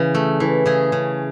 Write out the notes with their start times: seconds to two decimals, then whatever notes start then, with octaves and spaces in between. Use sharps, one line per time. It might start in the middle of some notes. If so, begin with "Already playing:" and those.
Already playing: C#3 E3
0.15 A3
0.40 E3
0.66 C#3 G#4
0.92 C#3